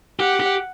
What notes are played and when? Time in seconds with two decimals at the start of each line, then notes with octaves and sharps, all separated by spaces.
0.20 G4 F#5
0.40 G4